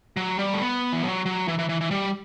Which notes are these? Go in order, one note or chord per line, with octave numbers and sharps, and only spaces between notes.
F#3
G3
A3
B3
E3
F#3
F#3
E3
E3
E3
E3
G3